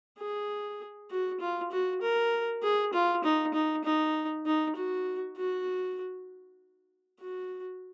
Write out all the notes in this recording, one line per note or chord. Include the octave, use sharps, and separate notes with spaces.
G#4
F#4
F4
F#4
A#4
G#4
F4
D#4
D#4
D#4
D#4
F#4
F#4
F#4